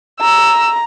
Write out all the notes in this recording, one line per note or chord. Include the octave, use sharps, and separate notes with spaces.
A#5 E6